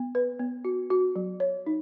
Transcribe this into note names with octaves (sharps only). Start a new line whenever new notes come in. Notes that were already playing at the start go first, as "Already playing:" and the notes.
Already playing: B3
B4
B3
F#4
F#4
F#3
C#5
D#4